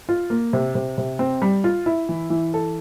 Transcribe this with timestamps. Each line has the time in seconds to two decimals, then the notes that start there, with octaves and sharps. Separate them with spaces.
0.09 F4
0.30 A#3
0.53 C3
0.75 C3
0.98 C3
1.19 C4
1.42 G3
1.64 F4
1.86 E4
2.09 E3
2.30 E3
2.54 A4